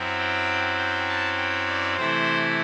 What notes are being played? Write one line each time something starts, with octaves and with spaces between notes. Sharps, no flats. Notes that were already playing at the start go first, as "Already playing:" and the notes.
Already playing: F#2 F#3 C4 E4
G5
G5
A5
G5
D5
C3 E3 A3 E4 C5